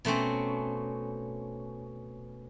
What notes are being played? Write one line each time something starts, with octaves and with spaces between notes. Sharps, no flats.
B2 A3 C4 C#4